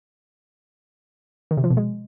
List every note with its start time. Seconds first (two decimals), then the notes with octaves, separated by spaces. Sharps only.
1.51 D#3
1.57 C3
1.64 F3
1.70 B2
1.77 G#3